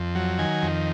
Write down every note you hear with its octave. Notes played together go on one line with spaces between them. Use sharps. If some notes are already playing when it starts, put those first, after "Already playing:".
Already playing: F2
F#3
D#3 G#5
F2